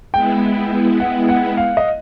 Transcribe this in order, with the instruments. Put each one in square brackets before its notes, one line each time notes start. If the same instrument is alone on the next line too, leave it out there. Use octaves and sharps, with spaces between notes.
[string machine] G#3 B3 E4 [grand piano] G5
[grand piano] F#5
F#5
F5
D#5